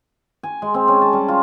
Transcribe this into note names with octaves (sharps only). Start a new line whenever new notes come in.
G#5
G#3
C4
C#4
A5
G3
F4